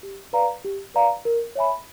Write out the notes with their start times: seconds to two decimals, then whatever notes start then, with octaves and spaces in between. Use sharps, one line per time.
0.03 G4
0.33 B4 D5 F5 A#5
0.64 G4
0.94 B4 D5 F5 A#5
1.25 A#4
1.55 C#5 E5 G#5 B5